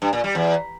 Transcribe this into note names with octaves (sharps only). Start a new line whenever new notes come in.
G2
A#2
G3
E2